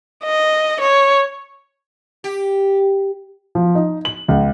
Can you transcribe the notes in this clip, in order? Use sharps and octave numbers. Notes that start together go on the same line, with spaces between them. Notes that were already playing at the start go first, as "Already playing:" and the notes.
D#5
C#5
G4
F3
D#4
F#7
C#2